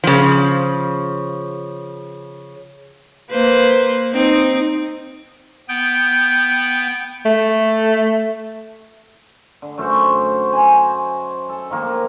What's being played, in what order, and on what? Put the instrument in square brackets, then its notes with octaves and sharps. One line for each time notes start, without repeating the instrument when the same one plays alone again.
[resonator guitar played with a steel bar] C#3 F3
[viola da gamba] A#3 B4 C5
C4 D#4
[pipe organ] B3 G5 G6
[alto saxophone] A3
[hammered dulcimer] D3
F#2 A3 F#4 C5
C5 D#5 G#5
A4
D#3 F3 A#3